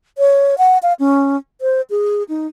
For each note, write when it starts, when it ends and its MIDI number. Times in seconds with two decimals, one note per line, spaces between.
0.18 0.55 73
0.58 0.78 78
0.83 0.93 77
0.99 1.37 61
1.61 1.81 72
1.90 2.23 68
2.29 2.47 63